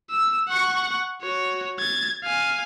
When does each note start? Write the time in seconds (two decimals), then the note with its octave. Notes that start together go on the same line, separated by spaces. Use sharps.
0.11 E6
0.48 F#5 C#6
1.22 F#4 C#5
1.79 G#6 A6
2.23 F5 G#5